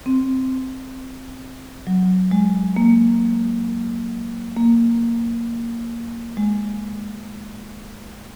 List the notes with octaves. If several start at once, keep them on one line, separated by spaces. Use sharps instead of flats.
C4
F#3
G#3
A#3
A#3
G#3